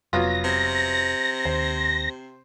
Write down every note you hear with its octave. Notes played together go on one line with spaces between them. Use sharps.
F1 F#3 B3 F4 A#6
C3
D#2 C5